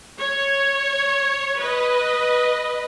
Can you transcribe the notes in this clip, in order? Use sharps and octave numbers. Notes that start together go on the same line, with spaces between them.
C#5
B4 D#5